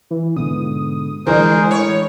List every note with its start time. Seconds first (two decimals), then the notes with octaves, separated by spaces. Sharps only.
0.10 E3
0.36 G#2 B2 D3 D#6
1.27 B1 D3 E3 F3 G#4 A#4 C5
1.39 G#3
1.71 A2 C#5